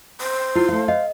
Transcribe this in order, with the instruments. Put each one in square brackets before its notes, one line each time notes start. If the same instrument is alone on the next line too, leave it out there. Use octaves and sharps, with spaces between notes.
[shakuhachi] C5
[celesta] E4 C7 [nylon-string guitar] F4
[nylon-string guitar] A3 F5
[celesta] D#5 [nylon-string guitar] F5